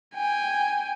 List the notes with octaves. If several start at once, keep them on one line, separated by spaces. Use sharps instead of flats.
G5 G#5